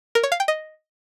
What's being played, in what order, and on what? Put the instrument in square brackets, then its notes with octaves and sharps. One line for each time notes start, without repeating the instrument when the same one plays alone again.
[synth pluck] A#4
C#5
F5
G5
D#5